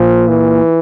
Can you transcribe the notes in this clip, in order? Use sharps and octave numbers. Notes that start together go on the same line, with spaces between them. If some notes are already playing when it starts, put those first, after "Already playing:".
Already playing: A#2 F3
E3